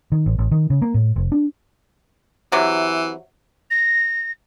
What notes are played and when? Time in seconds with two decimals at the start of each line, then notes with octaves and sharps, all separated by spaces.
0.12 D#3
0.26 A1
0.38 A1
0.51 D#3
0.70 C#3
0.82 A#3
0.94 A2
1.16 F1
1.32 D4
2.52 C3 E3 F#3
3.71 A#6